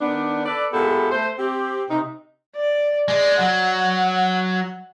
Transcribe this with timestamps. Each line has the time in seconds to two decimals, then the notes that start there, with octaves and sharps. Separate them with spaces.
0.01 D#3 B3 D4
0.45 A4 B4 D5
0.73 A#2 G#3 B3 E4 G4 A4
1.11 A3 C5
1.39 C4 G4
1.89 C3 D#4
2.56 D5
3.08 G#3 D5
3.39 F#3 F#5